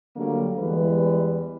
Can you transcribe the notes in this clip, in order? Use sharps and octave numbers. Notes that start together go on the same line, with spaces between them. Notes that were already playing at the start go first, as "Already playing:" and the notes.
D3 F#3 G3 A3 A#3
E2 E3 G3 G#3 B4